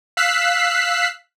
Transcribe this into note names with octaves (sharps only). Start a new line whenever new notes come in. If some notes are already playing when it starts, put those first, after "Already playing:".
F5 E6 F#6 B6 C7